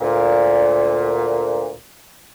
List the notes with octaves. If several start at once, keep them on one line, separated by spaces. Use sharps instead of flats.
D2 A#2